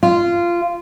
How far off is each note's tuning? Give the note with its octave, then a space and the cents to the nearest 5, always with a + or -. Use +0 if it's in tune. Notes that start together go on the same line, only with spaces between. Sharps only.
F4 -15